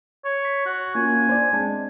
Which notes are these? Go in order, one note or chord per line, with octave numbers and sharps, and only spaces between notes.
C#5
B6
F#4
A#3 C#4 F4 G#5
D4 C5 D5
G#3 C4 D4